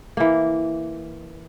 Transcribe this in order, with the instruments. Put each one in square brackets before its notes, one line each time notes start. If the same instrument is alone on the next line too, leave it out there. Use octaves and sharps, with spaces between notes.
[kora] E3 A#3